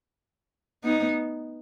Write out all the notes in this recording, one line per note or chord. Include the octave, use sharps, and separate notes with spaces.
B3 D#4